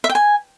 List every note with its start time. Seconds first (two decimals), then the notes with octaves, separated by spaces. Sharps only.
0.04 E5
0.09 G5
0.15 G#5